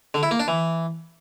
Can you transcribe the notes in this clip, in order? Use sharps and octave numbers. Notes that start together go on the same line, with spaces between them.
D3
E4
A#3
D4
E3